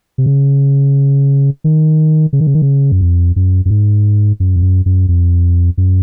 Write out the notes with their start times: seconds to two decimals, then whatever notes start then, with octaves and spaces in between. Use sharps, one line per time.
0.18 C3
0.26 C#3
1.64 D#3
2.33 C#3
2.40 D#3
2.47 C#3
2.54 D#3
2.62 C#3
2.92 F#2
3.01 F2
3.36 F#2
3.65 F#2
3.71 G#2
4.40 F#2
4.56 F2
4.62 F#2
4.86 F#2
5.08 F2
5.77 F#2